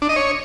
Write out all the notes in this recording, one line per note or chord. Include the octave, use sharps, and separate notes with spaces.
D4
D#5
C#5